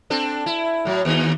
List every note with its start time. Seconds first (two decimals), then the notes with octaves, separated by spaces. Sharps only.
0.10 C4 D4 A4
0.46 E4
0.85 A2 F#3
1.05 D#2 D#4